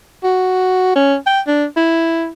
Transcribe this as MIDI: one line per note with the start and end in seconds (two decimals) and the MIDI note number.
0.24 0.93 66
0.96 1.16 61
1.27 1.41 79
1.47 1.65 62
1.76 2.28 64